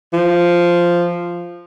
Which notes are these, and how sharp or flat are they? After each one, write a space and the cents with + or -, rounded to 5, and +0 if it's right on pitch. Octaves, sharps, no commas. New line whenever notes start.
F3 -5